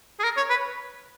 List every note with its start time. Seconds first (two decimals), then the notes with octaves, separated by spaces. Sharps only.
0.19 G#4
0.24 A#4
0.37 C#5
0.50 B4